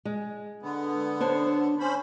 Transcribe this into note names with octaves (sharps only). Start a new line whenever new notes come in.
G#3
D3 B3
D4 C5 C#5
C#4 C5 B5